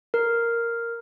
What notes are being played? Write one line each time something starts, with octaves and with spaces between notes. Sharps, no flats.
A#4